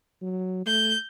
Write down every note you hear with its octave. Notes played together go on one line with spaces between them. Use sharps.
F#3
A3 G6